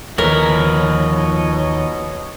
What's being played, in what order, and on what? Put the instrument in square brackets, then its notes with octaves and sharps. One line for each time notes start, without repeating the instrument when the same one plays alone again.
[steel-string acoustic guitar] D#2 [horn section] B2 C#5 D#5 [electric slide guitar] F3 B4 [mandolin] A#4